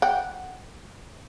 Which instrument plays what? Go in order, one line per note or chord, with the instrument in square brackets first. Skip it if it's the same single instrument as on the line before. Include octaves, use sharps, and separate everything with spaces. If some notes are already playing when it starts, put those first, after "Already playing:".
[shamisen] F#5 G5